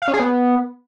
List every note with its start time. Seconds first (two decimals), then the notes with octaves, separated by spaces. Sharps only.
0.02 F5
0.08 C#4
0.14 G#4
0.19 B3